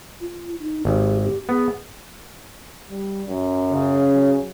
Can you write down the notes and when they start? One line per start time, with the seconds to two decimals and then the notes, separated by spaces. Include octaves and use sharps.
0.21 F4
0.59 D#4
0.85 G#1 G4
1.21 G4
1.49 B3 G#4
2.90 G3
3.28 F#2
3.72 C#3
4.14 F#3